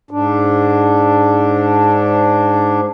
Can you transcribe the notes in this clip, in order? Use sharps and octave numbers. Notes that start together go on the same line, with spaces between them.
G#2 D4